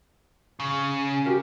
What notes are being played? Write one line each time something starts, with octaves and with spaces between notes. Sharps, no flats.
C#3
F#4 G4 A#4